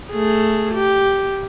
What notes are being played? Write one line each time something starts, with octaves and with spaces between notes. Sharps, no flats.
A3 G#4
G4